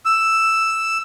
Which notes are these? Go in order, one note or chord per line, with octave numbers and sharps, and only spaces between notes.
E6